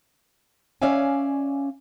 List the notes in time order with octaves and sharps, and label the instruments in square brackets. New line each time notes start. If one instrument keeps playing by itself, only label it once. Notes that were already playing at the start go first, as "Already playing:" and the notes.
[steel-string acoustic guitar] C#4 C#5 D5 E5 F5 G#5